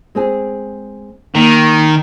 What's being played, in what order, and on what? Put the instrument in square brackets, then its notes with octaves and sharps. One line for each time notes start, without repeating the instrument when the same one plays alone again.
[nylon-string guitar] G#3 C4 G#4
[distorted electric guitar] D#3 [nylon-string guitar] A#3